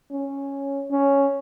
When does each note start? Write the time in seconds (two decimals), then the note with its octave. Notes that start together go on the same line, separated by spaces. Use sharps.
0.12 C#4
0.91 C#4